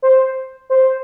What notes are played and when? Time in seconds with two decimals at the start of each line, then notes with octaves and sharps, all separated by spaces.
0.02 C5
0.70 C5